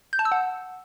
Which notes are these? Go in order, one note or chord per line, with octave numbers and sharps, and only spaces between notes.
G6
A5
E6
F#5